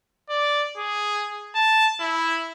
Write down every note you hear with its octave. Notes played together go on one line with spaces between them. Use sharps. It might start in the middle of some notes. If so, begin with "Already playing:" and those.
D5
G#4
A5
E4